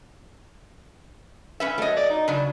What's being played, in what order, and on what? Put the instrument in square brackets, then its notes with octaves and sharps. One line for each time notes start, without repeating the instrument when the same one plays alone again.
[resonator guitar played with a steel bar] C#4 B4 E5
[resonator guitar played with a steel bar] F#3 D#5 [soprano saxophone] A3
[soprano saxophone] D5
D#4
[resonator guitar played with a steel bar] C#3 F#3 [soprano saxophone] D4